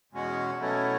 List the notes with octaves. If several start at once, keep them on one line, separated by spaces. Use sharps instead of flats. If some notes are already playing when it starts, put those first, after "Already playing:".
E2 B2 G#3 C#4 F#4
B2 F#3 A3 C#4 E4